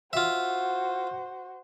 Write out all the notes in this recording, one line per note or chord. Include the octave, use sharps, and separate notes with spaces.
F4 F#4 C5 E5